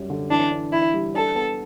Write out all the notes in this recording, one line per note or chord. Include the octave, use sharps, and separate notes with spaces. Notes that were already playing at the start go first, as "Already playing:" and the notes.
Already playing: F#2 G3
D3
E3 D4
D4
E3 E4
G3
D4 A4
B3